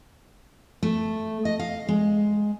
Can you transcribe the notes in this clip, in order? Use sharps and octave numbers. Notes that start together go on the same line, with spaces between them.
A3
D#5
F5
G#3